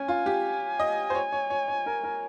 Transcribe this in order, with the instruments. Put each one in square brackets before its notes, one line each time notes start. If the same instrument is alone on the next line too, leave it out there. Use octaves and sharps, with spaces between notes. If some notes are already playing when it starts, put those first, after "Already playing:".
Already playing: [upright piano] C#4 [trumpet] G#5
[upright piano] F4
G4
D#5
C5
C#5
C#5
C#5
C#5
A#4
A#4